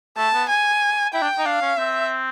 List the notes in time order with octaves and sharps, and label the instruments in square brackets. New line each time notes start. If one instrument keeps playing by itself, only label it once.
[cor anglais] A3 [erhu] A5
[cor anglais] B3
[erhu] G#5
[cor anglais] E4 [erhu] G5
[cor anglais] D4
D#4
[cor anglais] D4 [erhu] F5
[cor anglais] C#4
[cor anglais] C4 [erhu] E5